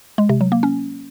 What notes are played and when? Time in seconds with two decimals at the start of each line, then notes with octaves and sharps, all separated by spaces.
0.18 G#3
0.29 C3
0.41 F#3
0.52 A#3
0.63 C#4